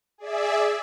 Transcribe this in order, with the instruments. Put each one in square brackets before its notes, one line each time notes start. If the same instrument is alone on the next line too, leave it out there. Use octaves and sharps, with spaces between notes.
[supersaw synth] G#4 D5 E5